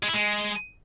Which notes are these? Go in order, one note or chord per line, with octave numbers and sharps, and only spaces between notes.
G#3
E4
G#3